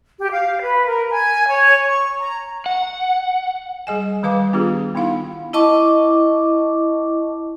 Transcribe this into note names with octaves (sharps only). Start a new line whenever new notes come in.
G4
F5
B4
A#4
G#5
C#5
C#6
A#5
F#5
G3 G#4 D#5 G#5
D#3 G3 B4 F5 A5 D6
B3 D4 F4 G4 G#4
B3 D#4 E4 F5 F#5 B5
E4 D#5 A5 C#6 D6